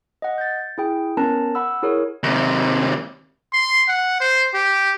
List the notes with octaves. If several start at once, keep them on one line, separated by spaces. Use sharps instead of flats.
D#5 F#5
G6 A6
E4 G#4 G5
B3 C#4 A#4 A5 A#5
F#5 B5 E6
E4 G#4 A#4 C#5
D#2 C3
C6
F#5
C5
G4